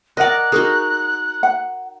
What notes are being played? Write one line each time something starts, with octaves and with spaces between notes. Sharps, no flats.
A#4 D5 D#5 F#5 F#6
D#4 F#4 G#4 A#4
F#5